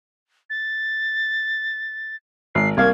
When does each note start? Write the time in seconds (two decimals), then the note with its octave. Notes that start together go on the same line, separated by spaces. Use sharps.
0.50 A6
2.55 G#1 C7
2.77 C2 A#3 F5 G#6